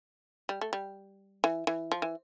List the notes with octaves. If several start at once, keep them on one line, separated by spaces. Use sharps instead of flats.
G3
A3
G3
E3
E3
F3
E3